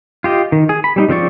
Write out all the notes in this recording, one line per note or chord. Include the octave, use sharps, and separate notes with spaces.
F4 G4 D#5
D#3
G#4
B5
G3 C4 D#4
C#3 F3 C4 D5 C#6